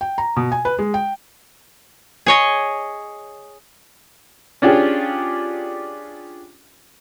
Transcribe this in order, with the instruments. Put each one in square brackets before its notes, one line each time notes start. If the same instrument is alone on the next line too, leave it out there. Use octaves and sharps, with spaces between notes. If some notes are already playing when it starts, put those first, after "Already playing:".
[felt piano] G5
A#5
B2
G#5
B4
G#3
G5
[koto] G#4 C#5 D#5
[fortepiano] C#4 D4 F4 G4 G#4